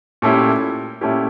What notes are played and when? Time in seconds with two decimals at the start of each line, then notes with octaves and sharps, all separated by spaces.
0.22 A#2 A3 C#4 E4 G4
1.01 A#2 A3 C#4 E4 G4